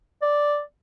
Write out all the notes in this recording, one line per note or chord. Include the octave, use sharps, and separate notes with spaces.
D5